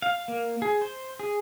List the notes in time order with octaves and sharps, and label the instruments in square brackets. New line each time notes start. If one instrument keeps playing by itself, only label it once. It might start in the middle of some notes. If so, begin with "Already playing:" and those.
[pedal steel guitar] F5
A#3
G#4
C5
G#4